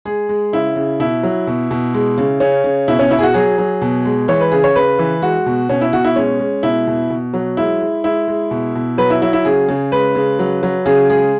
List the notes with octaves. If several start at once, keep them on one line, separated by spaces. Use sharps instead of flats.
G#3 G#4
G#3
C#3 E4
C#3
B2 E4
F#3
B2
B2
G#3
C#3
C#3 C#4
C#3
B2 E4
C#4
B2 E4
G#4
F#4
F#3 G#4
F#3
B2
G#3
E3 C#5
B4
C#3 G#4
C#5
C#3 B4
E3
G#3 F#4
B2
B2 C#4
E4
B2 F#4
E4
G#3 C#4
G#3
B2 E4
B2
B2
F#3
G#3 E4
G#3
G#3 E4
G#3
B2
B2
F#3 B4
E4
F#3 E4
E4
C#3 G#4
C#3
G#3 B4
C#3
F#3
F#3
C#3 G#4
G#3 G#4